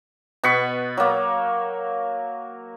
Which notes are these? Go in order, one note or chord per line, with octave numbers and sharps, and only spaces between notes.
B2 B3 B5 C#6
F#3 A#3